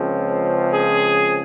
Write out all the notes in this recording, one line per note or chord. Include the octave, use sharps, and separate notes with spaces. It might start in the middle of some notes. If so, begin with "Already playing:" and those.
Already playing: C#2 C#3 F3 C4
G#4